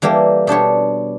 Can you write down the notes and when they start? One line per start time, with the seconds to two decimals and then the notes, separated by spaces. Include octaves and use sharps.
0.02 E3 G3 A#3 G4 A4
0.47 B2 D4 G4 C#5